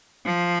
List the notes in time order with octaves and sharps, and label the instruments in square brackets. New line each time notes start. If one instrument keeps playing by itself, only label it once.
[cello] F3